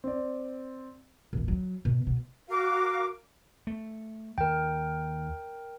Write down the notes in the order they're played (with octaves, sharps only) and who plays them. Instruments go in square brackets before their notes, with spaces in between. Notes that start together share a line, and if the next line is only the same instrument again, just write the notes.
[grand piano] C4 D5
[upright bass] A#1 E2
F#3
B2
B2
[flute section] F#4 A#4 F5 D6
[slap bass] A3
[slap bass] D#2 [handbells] A#4 G5